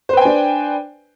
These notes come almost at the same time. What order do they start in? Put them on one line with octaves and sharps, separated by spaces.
C5 B4 G5 G#5 D4